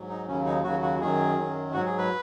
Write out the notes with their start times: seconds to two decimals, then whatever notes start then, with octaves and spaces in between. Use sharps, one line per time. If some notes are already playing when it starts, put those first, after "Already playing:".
Already playing: G#2 F#3
0.09 D#4
0.27 D#2 C#3 F#3 C#4
0.46 D#4
0.63 D#2 C#3 F#3 F#4
0.82 F#4
1.01 F#2 D#3 F#3 G#4
1.37 F#2 D#3 F#3
1.74 G#2 F#3 F#4
1.86 G#4
1.98 B4